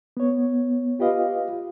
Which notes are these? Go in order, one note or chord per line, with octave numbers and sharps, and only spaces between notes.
B3 C#5
F4 G4 B4 D#5 F5